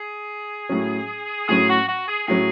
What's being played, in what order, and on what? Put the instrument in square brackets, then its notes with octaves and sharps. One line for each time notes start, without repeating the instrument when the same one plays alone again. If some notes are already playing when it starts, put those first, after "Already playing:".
Already playing: [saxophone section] G#4
[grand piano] A2 F#3 C#4
[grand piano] A2 F#3 C#4 [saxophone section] G#4
[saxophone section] F#4
F#4
G#4
[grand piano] A2 F#3 C#4 [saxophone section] G#4